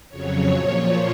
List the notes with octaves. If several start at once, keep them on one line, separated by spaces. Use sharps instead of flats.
F2 C#3 F#3 C#5
A#2 F3